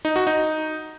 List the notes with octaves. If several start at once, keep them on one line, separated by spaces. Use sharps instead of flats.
D#4
F#4
D#4